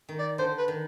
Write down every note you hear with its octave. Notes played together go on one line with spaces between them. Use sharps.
D#3
D5
D3 C5
B4
D#3